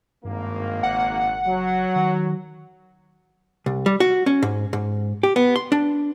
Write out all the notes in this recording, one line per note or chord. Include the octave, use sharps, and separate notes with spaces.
G#1 G2 A#3
F#1 F#5
F#3
D#3
C2
G3
F#4
C#4
G#2
G#2
G4
B3
C6
D4